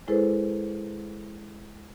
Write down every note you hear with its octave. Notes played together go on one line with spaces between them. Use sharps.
G#3 E4 G#4 A4 B4 C5